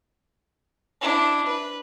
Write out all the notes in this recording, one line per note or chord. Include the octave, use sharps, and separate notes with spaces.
D4 E4
B4